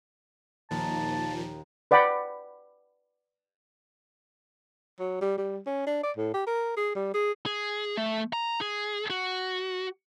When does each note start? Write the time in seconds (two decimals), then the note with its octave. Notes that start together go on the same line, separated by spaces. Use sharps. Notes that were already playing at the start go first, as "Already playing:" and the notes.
0.71 D#2 A#2 F3 A5
1.91 B4 D5 F#5 G5 B5
4.99 F#3
5.22 G3
5.38 G3
5.66 C#4
5.87 D4
6.03 D5
6.17 A2
6.34 G4
6.47 A#4
6.77 G#4
6.96 G3
7.14 G#4
7.46 G#4
7.97 A3
8.33 A#5
8.61 G#4
9.10 F#4